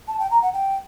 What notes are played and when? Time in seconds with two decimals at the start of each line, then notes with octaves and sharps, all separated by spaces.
0.08 A5
0.19 G5
0.31 A#5
0.42 F#5
0.53 G5